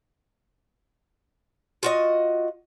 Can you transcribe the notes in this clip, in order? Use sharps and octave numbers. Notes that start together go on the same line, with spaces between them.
F4 F#4 D#5